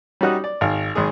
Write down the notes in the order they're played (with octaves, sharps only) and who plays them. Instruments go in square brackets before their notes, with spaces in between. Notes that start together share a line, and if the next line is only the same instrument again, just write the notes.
[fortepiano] G3 C#4 D#4 F#4 D#6 F#6
D5
G#1 F5
G#1 G#3 G#4